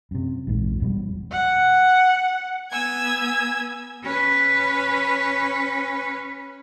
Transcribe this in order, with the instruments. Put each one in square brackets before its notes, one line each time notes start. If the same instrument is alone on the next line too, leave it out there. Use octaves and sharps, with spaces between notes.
[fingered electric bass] F#2 C3
A#1 E2 G#2
E1 F2 B2 G3
[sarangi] F#5
[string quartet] B3 G#5 E6 G#6
[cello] C#4 B4